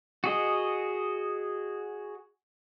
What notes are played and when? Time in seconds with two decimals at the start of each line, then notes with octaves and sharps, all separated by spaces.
0.24 F#4 G#4 D#5